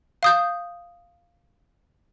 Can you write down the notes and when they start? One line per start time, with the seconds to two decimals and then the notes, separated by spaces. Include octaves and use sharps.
0.23 F5 D#6 G6